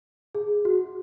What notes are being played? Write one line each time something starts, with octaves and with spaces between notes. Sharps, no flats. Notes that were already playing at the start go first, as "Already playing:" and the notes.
G#4
F#4